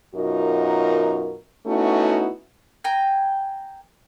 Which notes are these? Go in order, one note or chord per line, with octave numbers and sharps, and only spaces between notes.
F#2 B2 D#4 F4 F#4 A#4
A3 B3 C#4 D#4 E4 F#4
G5 G#5 A#5